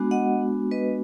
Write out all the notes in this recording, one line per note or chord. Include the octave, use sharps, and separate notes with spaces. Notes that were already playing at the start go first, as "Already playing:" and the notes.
Already playing: G#3 B3 D4 F#4
D#5 F#5
B4 D#5